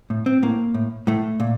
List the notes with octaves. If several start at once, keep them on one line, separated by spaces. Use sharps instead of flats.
A2
C4
A2 A#3
A2
A2 A3
A#2